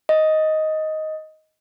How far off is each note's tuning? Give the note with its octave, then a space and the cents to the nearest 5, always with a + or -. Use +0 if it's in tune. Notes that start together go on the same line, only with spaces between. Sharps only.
D#5 +10